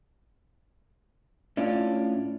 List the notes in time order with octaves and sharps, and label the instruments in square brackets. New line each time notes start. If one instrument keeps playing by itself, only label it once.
[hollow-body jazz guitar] A2 C#4 D4 F4